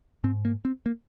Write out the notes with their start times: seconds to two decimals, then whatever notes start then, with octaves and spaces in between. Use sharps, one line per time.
0.24 G#2 C4
0.45 A#3
0.65 C4
0.86 A#3